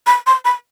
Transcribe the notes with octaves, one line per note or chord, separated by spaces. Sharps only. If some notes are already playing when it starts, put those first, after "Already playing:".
B5
C6
B5